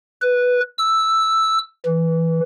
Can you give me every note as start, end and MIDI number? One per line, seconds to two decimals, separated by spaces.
0.21 0.60 71
0.78 1.58 88
1.86 2.40 52